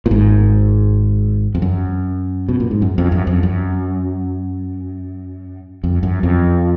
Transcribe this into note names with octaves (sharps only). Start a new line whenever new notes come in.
A#2
G#1 G#2
F2
F#2
B2
A#2
G#2
F#2
F2
F#2
F2
F#2
F2
F#2
F2